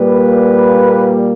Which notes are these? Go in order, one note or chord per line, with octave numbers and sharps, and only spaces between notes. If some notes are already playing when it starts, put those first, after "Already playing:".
Already playing: A#2 G3 A#3 B4